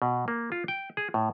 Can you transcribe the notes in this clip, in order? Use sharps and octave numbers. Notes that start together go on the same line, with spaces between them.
B2
A#3
F4
G5
G#4
A2